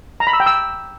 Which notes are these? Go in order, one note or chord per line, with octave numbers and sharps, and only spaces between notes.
A#5
B5
E6
G5
E6